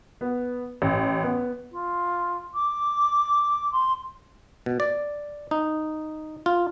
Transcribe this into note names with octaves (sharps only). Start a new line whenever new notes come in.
B3
A1
B3
F4
D6
C6
B2
D5
D#4
F4